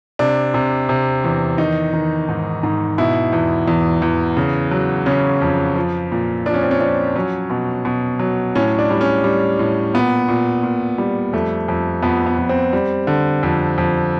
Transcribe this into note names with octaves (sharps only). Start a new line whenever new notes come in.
C3 D4
C3
C3
E2
D#3 D#4
D#3
G#2
G#2
B2 E4
E2
E2
E2
C#3
F#3
C#3 C#4
F2
F3
A#2
F3 D4
C#4
C4
C#4
F3 D4
F#3 C#4
B2
B2
F#3
A2 C#4
D4
G3
C#4
G3
A2
A#2 B3
A#2
A#2
G3
F2 A3
F2
F2 B3
B3
F2
C4
G3
D3
F2
F2